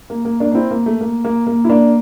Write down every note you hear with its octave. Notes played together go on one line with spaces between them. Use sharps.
A#3
A#3
A#3 D4
D4
C4 E4
A#3
A3
A#3
A#3
A#3
E4
A#3 D4